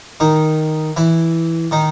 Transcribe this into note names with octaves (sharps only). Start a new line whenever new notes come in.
D#3 D#4
E3 E4
D#3 D#4